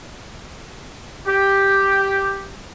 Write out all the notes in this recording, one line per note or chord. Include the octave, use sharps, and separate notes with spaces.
G4